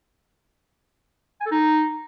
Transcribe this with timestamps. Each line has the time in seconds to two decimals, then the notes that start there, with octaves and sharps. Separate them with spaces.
1.41 G#5
1.46 A4
1.51 D#4